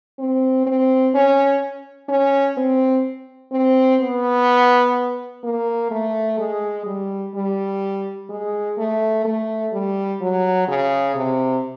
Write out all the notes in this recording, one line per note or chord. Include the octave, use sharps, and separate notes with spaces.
C4
C4
C#4
C#4
C4
C4
B3
A#3
A3
G#3
G3
G3
G#3
A3
A3
G3
F#3
C#3
C3